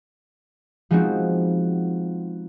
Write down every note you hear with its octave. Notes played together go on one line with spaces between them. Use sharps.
F3 G#3 B3 C4 D#4 F#4